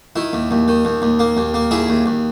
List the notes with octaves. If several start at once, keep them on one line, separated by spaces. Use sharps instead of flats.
D#3 E4
D#2
D#2
D#3
D#2
D#2
A#3
D#2
A#3
D#2 E4 G#4
D#2
D#2